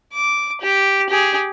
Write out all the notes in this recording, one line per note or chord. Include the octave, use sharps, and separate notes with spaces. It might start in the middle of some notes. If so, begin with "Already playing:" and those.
D6
G4
G4 G#4